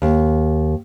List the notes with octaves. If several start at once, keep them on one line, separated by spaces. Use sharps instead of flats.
D#2